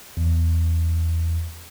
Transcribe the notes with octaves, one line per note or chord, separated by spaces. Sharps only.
E2